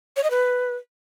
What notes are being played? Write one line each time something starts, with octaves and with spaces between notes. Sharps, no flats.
C#5
D#5
B4